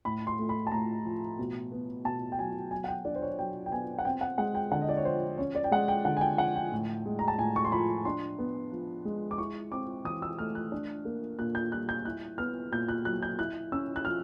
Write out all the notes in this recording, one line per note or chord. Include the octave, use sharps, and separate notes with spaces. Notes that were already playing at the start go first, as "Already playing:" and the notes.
A2 B5
C6
A3
B5
A5
A2 A#5
F3
B2
B3
B2 A5
G5
F#3 G#5
F#3 G#5
F#5
G5
D4 D5
C5
C#5
F#3 G5
G5
B3 G#5
F#5
C4 G5
F#5
G#3 F#5
G5
D3 F#5
D#5
D5
C#5
F3 C5
C#4 C#5
D5
G5
G#3 F#5
G5
D3 F#5
G#5
G5
F3 F#5
G5
A2
G#3
A#5
A5
A2 G#5
C#6
C6
F3 B5
D4 C6
B3
F3
G#3
D6
E4 C#6
C4 D6
E3 D#6
E6
A3 F6
F#6
D4
A#3
A#2 F#6
G6
G3 F#6
G6
E4 F#6
B3 F6
A#2 G6
F#6
F#3 F#6
G6
E4 F#6
C#4 E6
F#6
F3 F6